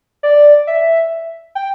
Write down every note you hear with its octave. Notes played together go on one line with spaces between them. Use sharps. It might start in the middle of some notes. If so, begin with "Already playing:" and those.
D5
E5
G5